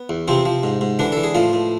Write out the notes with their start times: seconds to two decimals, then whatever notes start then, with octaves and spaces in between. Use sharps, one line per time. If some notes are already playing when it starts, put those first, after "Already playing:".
Already playing: B3
0.09 E2
0.28 C3 F3 C4
0.45 F3
0.63 G#2
0.81 G#2
0.99 D3 E3 D4
1.12 E3 A4
1.24 G#4
1.35 A2 F3 F4
1.53 A2